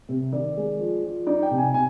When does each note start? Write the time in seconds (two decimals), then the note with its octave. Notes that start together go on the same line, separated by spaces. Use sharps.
0.09 C3
0.32 D#3 D5
0.57 G#3
0.79 F3
1.03 F3
1.27 D#4 D5
1.42 G5
1.51 C3
1.58 G#5
1.74 C3 G#5